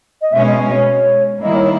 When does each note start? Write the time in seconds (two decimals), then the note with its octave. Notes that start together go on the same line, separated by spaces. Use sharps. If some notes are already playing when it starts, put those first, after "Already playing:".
0.22 D#5
0.33 B2 G#3 C#4 E5
0.47 D#5
0.74 C#5
1.42 D#3 G3 A#3 E4 D#5
1.55 C#5